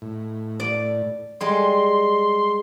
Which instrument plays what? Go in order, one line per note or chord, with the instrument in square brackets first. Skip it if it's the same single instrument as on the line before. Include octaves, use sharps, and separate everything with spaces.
[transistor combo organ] A2
[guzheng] D5
[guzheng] G3 G#3 [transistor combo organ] C6